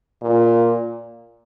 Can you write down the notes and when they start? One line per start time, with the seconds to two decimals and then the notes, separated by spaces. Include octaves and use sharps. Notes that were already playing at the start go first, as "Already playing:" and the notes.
0.22 A#2